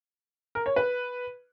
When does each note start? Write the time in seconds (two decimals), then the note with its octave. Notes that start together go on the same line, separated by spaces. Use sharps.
0.55 A#4
0.66 C#5
0.76 B4